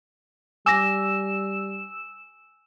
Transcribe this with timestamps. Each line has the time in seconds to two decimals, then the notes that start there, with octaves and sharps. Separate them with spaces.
0.66 G3 G#5 D6 E6 A#6 E7